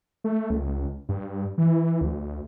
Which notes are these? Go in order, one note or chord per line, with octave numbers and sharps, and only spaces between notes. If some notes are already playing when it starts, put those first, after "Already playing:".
A3
C#2
G2
E3
D2